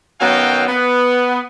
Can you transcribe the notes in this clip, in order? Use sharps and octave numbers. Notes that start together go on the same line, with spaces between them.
F#2 D#3 F#3 B3 F5 G5
B3